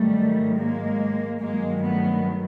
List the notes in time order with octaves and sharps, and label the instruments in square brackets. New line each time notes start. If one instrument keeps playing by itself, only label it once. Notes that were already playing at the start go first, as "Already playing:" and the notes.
Already playing: [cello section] G#2 D#3 F#3 G3 A3
G#3 A#3
G2 D#3 F#3 G#3 A#3
A3 B3